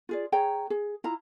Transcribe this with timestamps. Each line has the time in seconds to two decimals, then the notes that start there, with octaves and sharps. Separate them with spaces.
0.09 F4 G#4 D5
0.32 G#4 C#5 G5 A#5
0.70 G#4
1.04 E4 F4 A#5